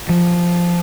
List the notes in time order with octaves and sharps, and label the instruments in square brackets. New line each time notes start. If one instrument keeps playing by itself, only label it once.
[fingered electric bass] F3